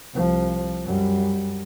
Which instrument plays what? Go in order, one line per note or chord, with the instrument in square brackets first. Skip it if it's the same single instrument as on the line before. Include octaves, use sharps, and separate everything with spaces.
[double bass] C2 F3
F#2 G3